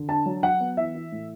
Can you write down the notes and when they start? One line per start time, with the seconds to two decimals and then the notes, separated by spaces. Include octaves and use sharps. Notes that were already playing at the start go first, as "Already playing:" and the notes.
Already playing: D3
0.09 D4 A5
0.26 F#3
0.43 F#3 F#5
0.60 B3
0.77 E3 E5
0.95 E3
1.12 A2